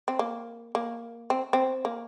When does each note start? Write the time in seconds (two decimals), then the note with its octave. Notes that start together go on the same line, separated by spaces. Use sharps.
0.08 C4
0.19 A#3
0.75 A#3
1.30 C4
1.53 C4
1.85 A#3